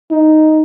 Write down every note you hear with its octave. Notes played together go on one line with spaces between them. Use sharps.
D#4